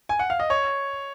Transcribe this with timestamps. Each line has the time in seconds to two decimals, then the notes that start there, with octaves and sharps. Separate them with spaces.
0.09 G#5
0.19 F#5
0.30 F5
0.40 D#5
0.50 C#5